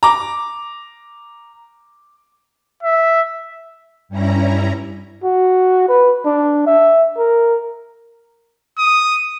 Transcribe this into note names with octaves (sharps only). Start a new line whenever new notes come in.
A#5 D6
E5
G2 G3 C#4 E4 A#5
F#4
B4
D4
E5
A#4
D#6